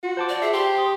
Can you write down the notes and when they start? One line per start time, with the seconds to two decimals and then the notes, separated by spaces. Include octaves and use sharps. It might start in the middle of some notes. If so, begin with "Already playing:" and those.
0.03 F4 F#4
0.17 C5 A5 D6
0.29 D5
0.42 G#4 E5 C7
0.53 G4 C6
0.78 D#6